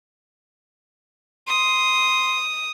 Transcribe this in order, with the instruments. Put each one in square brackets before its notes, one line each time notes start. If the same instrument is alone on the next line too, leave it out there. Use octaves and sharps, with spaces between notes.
[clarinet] C6 [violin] D#6